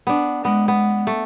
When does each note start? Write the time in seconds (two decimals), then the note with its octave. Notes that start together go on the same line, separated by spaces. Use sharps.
0.07 B3 D4
0.45 G#3 B3
0.68 B3
1.07 A3